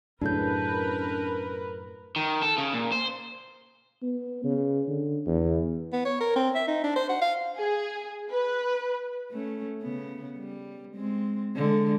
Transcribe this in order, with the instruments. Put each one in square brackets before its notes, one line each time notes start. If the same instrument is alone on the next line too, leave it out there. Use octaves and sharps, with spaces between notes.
[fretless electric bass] F#2 A2 C#3 [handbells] D4 G6 [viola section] A#4 B4
[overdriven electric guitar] D#3
A4
C#3
A#2
C5
[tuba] B3
C#3
D3
E2
[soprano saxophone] B3
C#5
A#4
C4
E5
D#4
D4
C5
F#5
F5
[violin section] G#4
B4
[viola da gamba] A3 C#4
C#3 B3
G3
G#3 C4
D3 G#3